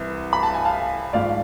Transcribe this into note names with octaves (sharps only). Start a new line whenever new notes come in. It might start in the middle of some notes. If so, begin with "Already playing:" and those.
Already playing: C2 C3 E3
B5
A5
G#5
F5 A5
G#1 G#2 F3 D5 F5